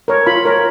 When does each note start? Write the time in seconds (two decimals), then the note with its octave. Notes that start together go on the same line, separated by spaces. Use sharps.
0.08 A#4 C#5
0.26 F4 B5
0.45 A#4 C#5